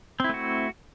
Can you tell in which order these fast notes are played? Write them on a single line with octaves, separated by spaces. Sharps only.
C4 E4 A3 F#4